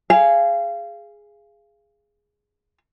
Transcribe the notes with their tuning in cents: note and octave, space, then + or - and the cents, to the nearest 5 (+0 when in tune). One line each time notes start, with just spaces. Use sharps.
G#4 +0 F5 -25